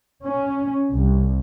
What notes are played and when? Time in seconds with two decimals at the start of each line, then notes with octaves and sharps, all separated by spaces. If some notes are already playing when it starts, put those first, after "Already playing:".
0.25 C#4
0.92 C2